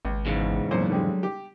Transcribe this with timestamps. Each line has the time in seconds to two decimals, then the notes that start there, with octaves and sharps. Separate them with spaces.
0.05 G#1 C#2
0.26 E2 G#2 C#3
0.71 F2 A#2 F#3 C5
0.90 D3 G3 G#3
1.23 G4